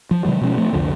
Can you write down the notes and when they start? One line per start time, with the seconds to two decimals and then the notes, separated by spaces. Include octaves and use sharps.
0.11 F3
0.25 C3 D#3 F#3 G#3
0.41 B2 F3 G#3 C#4
0.56 F3 A3 B3 C4
0.73 C2 F2 D3